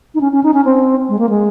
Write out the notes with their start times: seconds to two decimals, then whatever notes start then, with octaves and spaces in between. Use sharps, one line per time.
0.15 D#4
0.21 C#4
0.33 C#4
0.44 D#4
0.54 C#4
0.65 C4
1.09 G#3
1.19 A#3
1.29 G#3